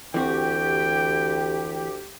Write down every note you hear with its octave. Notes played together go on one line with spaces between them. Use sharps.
D2 E3 C4 F#4 G4 G5